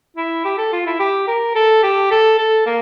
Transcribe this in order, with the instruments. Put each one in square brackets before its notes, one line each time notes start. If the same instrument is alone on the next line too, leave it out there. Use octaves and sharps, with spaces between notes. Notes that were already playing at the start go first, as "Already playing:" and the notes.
[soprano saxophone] E4
G4
A4
F4
E4
G4
A#4
A4
G4
A4
A4
A#3